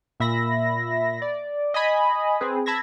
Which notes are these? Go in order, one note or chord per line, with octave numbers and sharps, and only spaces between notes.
A#2 E5 B5 A#6
D5
D#5 G#5 B5 D#6
C4 G#4 B4
A5 B5 E6 G#6 A#6